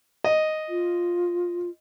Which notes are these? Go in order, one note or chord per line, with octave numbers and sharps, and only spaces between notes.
D#5
F4